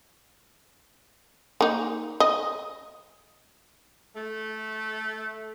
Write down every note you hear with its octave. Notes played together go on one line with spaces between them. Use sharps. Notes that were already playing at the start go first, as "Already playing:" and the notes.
A#3 D#4
D#5
A3